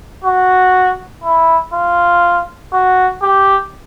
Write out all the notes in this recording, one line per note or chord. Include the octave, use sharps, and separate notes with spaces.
F#4
E4
F4
F#4
G4